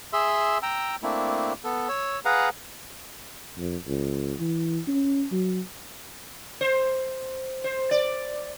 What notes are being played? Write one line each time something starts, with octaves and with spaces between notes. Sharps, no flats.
G#4 E5 C6 E6
G5 A#5 E6
A3 A#3 C4 D4 E4
B3 A4
C#5 E6
G#4 B4 F5 F#5 A#5
F2
C#2
E3
C#4
F#3
C5
C5
D5